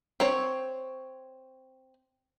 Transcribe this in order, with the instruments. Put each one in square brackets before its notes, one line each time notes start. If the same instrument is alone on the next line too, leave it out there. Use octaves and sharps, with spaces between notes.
[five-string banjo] C4 C#5